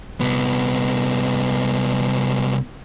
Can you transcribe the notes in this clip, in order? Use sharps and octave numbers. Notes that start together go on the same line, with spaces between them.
C2 B3